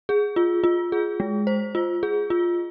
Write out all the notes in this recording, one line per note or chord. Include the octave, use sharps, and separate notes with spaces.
G#4
F4
F4
G#4
G#3
C5
F4
G#4
F4